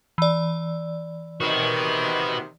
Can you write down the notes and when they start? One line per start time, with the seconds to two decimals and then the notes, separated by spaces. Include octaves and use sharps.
0.18 E3 D5
1.41 C3 D#3 B3 F#4